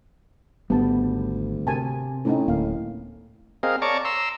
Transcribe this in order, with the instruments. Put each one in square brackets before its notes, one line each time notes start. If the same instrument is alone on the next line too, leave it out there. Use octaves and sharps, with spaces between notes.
[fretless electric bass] G#1 G3 [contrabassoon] D2 [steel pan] B3 A5
[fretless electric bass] C3 [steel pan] A#4 G#5 A5
[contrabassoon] A2 [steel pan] C4 C#4 D#4
[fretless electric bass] D1 [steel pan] A#3 F5
[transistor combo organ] C4 G#4 A#4 D#5 F5
C#5 D5 A5 A#5 C#6 D6
A#5 C6 E6